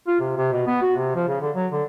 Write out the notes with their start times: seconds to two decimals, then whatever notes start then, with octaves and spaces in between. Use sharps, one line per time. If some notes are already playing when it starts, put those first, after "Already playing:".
0.07 F4
0.20 C3
0.37 C3
0.52 B2
0.67 B3
0.82 F#4
0.96 C3
1.15 F3
1.28 C#3
1.41 D3
1.55 F#3
1.72 D3